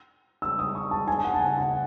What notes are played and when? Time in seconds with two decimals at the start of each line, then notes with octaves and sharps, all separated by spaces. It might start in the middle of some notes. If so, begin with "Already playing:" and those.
0.42 E6
0.59 D#6
0.75 C#6
0.91 A5
1.08 G#5
1.25 F#5
1.34 A5
1.40 G#5
1.58 F#5